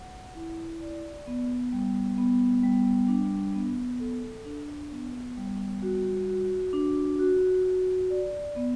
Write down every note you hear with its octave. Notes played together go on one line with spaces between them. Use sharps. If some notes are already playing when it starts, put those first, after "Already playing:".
Already playing: F#5
E4
D5
B3
G3
B3
G3
D4
B3
A4
D4
B3
G3
F#4
F#4
D4
F#4
F#4
D5
B3